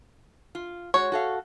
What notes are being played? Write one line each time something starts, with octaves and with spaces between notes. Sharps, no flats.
F4
G#3 F#4 C#5
F#4 A4 F5